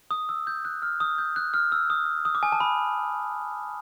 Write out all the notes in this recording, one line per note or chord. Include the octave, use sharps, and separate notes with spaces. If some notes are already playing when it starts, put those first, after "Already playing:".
D#6
E6
G6
F#6
F6
D#6
G6
F#6
F6
E6
D#6
D#6
D6
G#5
A5
B5